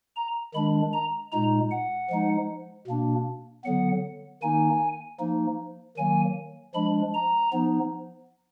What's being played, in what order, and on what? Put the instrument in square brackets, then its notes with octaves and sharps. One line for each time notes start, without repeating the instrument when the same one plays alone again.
[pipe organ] A#5
D#3 G#3 D4 B5
A#5
A#2 G#3 D#4 A#5
F#5
F3 G#3 D#4
B2 A#3 D4
D3 F#3 B3 F#5
D#3 A#3 D#4 G#5
F3 A#3 D#4
D#3 F#3 A#3 G#5
F3 G#3 D4 B5
A#5
F3 B3 D#4